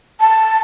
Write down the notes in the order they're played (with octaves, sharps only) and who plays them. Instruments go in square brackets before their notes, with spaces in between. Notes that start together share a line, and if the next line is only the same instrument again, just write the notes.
[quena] A5